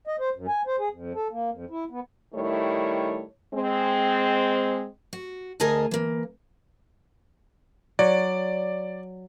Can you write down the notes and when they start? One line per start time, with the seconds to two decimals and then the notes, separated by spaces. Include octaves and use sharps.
0.07 D#5
0.20 C5
0.35 F#2
0.48 G#5
0.67 C5
0.79 G#4
0.91 F2
1.15 A4
1.31 A#3
1.51 F2
1.70 E4
1.90 B3
2.35 D#3 G3 A3 E4 C#5
3.55 G#3 C4
5.13 F#4
5.60 D2 G#4 A#4 D#5 G#5 A5
5.91 E3 A#3
7.99 F#3 D5